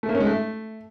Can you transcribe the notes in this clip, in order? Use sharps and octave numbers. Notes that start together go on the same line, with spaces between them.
A3
A#3
C#4
G#3
A3